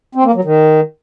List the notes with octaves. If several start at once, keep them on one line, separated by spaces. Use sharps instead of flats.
C4
A#3
F#3
D#3